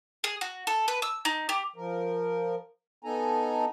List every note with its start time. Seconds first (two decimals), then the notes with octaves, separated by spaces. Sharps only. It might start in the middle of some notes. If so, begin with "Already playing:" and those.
0.24 G#4
0.41 F#4
0.67 A4
0.88 B4
1.02 E6
1.25 D#4
1.49 G4
1.76 F3 A#4
3.04 B3 D#4 A4 G#5 A#5